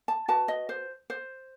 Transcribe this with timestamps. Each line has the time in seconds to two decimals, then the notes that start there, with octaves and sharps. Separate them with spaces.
0.08 A5
0.28 F#4 B4 A5
0.48 D#5
0.69 C5
1.10 C5